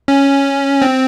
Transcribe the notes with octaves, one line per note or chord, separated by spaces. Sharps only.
C#4
C4